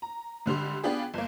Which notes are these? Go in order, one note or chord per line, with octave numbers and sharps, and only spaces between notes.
A#5
G#1 D3 G3 C6
B3 D4 F4 G4 G#4
G1 A#3